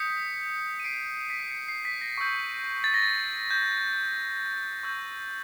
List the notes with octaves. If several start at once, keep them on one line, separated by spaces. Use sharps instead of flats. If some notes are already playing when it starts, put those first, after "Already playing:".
Already playing: D#6 G6 B6 C#7
D#7
C7 D7
B6
C7
B6 C#7
C7
B6
A#6
C#6 E6 G6
A6
A#6
A6
G6
C#6 E6 G6